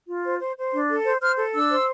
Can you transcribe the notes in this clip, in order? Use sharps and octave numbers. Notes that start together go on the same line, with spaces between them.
F4
C5
C5
C5
D4
A4
C5
C5 F6
A4
D4 E6
C5